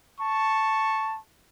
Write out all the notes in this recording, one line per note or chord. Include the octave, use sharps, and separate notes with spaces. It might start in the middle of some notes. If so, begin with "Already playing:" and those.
A5 C#6